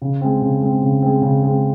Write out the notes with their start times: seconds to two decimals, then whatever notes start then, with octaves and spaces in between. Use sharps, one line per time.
0.02 C#3
0.21 G#3 C4
0.42 C#3
0.62 G#3 C4
0.82 C#3
1.02 G#3 C4
1.22 C#3
1.43 G#3 C4